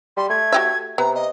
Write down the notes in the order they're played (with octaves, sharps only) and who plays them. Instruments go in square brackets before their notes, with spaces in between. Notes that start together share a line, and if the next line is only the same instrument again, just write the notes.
[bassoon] G3 [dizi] C6
[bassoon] A3 [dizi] G#6
[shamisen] F#4 G4 E5
[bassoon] C3 [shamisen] B3 [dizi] A#5
[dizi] D#5